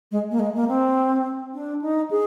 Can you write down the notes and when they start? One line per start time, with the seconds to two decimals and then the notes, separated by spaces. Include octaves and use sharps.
0.11 G#3
0.31 A#3
0.39 G#3
0.55 A#3
0.68 C4
1.54 D4
1.82 D#4
2.11 G#4